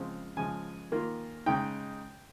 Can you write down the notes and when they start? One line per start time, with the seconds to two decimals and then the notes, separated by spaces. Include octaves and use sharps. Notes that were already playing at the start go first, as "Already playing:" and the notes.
Already playing: C#3 F3 G#3 C4 F4
0.37 C#3 F3 G#3 G#5
0.92 D#3 A#3 F4
1.46 C#3 G#3 D#4 G5